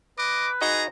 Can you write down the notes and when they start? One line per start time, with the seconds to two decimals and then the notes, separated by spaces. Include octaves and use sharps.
0.18 B4 D#5 D6
0.61 D#4 F#4 G#4 D#5 A#5